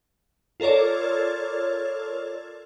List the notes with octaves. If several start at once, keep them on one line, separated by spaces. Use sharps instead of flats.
F4 A4 A#4 C#5 D5